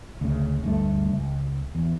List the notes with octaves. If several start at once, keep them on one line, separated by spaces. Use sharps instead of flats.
D2 C#3
D2 G2 A3
C#2
E2